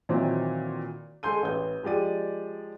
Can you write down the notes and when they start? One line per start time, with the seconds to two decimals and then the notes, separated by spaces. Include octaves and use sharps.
0.09 A#2 D#3 E3 F#3 C4
1.23 G#3 A4 G#5 C6 G6 D#7
1.43 A1 B4 G6
1.83 F3 G#3 G4 D5 D#7